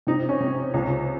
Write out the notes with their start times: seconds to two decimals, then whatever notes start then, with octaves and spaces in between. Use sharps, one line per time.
0.07 C3 D#4
0.29 C#4
0.40 C3
0.74 C#2